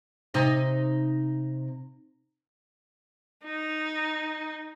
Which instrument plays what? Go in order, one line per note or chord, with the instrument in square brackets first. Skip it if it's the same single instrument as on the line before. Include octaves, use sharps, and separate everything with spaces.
[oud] C3 D#4 D#5
[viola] D#4